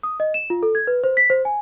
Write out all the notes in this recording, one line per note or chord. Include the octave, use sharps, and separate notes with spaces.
D#6
D#5
E7
F4
A4
G#6
B4
C5
B6
C5
G#5